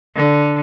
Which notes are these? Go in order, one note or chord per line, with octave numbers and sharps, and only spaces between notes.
D3